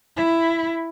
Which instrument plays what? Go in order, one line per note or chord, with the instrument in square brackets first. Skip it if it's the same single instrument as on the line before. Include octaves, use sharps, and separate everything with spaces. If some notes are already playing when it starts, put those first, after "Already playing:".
[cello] E4